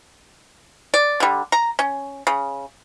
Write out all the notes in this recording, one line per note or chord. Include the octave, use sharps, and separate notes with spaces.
D5
D3 G3
A#5
C#4
C#3